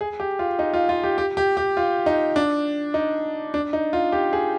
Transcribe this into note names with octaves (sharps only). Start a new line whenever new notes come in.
G#4
G4
F4
D#4
F4
F4
G4
G4
G4
G4
F4
D#4
D4
D#4
D4
D#4
F4
G4
G#4